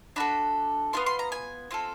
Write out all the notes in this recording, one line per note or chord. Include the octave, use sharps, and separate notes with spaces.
D4 F#4 A4 B5
B3 D4 F4 C6
C6
A#5
G#5
C4 F4 A4